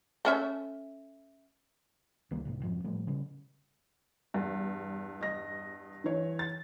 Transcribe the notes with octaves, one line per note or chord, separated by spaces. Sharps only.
A3 C#4 E5
C#2 D#3 G3 A#3
C2 G#2 C3
F2 G#2 F3
A2 F3 G3 A3
C#3 G3
E2 G2
D#5 A#6
E3 C#5
A6